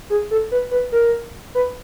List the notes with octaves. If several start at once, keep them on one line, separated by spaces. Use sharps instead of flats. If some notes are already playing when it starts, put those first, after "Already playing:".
G#4
A4
B4
B4
A#4
B4